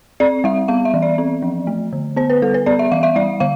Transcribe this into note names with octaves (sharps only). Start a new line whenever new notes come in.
C4 D5
G3 E5
B3 F5
E5
E3
D5
C4
F3
A3
D3
B3 C5
B4
G3 A4
B4
B3 D5
E5
E3 F5
E5
G3 D5
D3 F5